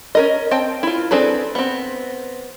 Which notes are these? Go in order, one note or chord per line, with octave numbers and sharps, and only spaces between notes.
C#4 A#4 D#5
C4 G5 A5
E4 F4
C4 D4 G#4 A4 B4
B3 C4